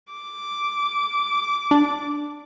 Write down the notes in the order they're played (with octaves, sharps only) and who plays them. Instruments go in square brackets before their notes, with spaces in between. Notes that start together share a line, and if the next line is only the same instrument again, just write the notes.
[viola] D6
[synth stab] D4